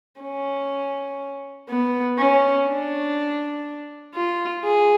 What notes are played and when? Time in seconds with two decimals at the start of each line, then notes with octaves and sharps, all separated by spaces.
0.22 C#4
1.69 B3
2.19 C#4
2.69 D4
4.15 F4
4.65 G#4